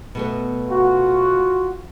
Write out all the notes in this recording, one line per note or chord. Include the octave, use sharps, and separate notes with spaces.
B2 A3 B3
F4 F#4